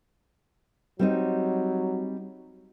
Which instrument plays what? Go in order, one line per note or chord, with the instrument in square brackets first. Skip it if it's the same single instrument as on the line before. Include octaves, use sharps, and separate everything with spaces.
[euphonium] F#3 [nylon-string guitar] G3 C4 D#4